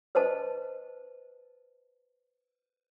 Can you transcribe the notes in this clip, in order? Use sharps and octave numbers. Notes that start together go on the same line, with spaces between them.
B4 C5 D#5 A5